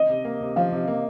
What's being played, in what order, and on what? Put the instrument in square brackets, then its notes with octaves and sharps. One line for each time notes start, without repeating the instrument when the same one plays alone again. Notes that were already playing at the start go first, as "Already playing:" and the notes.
Already playing: [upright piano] D#5
[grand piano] C3
A#3
C3
[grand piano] F3 [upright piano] F5
[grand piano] C3
A#3